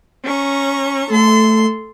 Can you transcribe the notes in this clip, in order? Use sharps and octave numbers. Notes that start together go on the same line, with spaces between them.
C#4 A#5 C#6
A3 A4 C6